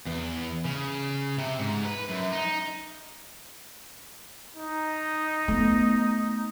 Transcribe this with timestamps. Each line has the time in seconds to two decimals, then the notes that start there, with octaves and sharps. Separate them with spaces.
0.06 E2
0.65 C#3
1.39 C3
1.59 G#2
1.85 B4
2.09 F#2
2.32 D#4
4.57 D#4
5.48 A3 B3